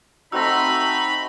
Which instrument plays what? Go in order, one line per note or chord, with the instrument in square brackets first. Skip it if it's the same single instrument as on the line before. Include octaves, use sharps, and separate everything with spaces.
[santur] A3 C4 F#4 [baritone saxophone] D#4 [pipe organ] B5 [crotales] E6 A#6